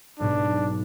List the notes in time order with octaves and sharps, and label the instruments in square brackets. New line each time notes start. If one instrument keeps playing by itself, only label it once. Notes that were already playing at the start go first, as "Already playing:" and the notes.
[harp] B1 G#2 B2 [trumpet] D4